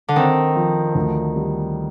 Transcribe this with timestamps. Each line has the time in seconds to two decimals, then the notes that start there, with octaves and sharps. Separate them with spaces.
0.08 D3
0.16 D#3 C4
0.55 F3
0.95 D2
1.36 G3